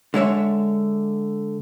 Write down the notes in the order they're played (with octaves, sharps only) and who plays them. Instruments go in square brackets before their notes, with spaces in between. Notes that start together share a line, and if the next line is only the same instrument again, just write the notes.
[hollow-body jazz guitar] D3 G#3 C#5 E5